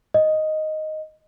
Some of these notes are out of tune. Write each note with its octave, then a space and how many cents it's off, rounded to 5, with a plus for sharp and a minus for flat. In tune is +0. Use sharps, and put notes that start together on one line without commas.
D#5 +0